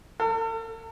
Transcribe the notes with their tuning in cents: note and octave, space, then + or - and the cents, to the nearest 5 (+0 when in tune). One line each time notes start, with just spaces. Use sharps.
A4 +45